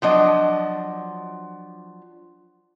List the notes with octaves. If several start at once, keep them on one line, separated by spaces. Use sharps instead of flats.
F3 F#3 D4 D#5